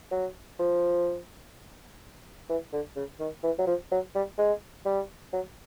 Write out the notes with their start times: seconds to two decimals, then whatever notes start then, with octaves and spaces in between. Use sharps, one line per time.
0.12 F#3
0.59 F3
2.49 E3
2.73 D3
2.96 C#3
3.20 D#3
3.43 E3
3.58 F#3
3.67 F3
3.91 F#3
4.15 G3
4.38 G#3
4.86 G3
5.33 F#3